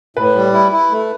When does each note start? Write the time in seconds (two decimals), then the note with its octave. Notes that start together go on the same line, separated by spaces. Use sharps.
0.17 A2 B4
0.35 G3
0.54 E4
0.72 E4
0.91 A3